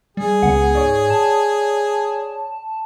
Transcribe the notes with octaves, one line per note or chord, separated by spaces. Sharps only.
G3 G#4
C#2 B3 F#5
G#2 C#5 D5
A5